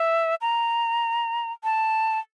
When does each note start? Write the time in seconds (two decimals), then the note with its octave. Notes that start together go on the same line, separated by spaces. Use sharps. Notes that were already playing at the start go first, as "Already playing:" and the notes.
Already playing: E5
0.41 A#5
1.64 A5